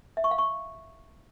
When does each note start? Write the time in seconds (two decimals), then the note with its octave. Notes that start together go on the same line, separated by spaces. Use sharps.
0.17 E5
0.24 C#6
0.31 F5
0.38 C#6